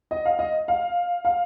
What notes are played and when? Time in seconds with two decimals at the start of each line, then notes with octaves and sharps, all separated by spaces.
0.11 D#5
0.25 F5
0.39 D#5
0.68 F5
1.25 F5